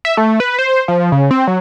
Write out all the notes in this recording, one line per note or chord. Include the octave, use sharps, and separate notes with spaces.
E5
A3
B4
C5
F3
C#3
C4
F#3